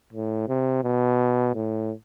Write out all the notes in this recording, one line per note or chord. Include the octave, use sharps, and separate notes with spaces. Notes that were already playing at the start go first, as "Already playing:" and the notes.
A2
C3
B2
A2